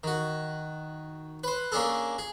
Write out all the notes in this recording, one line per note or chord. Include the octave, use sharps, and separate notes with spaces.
D#3 F#4
B4 C5
A#3 C#4 D4 G#4 A4
G#4